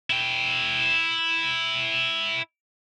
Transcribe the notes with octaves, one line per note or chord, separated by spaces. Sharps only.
E4 G5